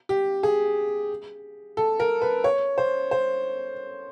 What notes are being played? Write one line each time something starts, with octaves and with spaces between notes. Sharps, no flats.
G4
G#4
A4
A#4
B4
C#5
C5
C5